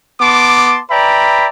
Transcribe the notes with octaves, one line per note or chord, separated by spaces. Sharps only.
B3 A5 C6 D6
B4 D5 E5 G5 A#5 B5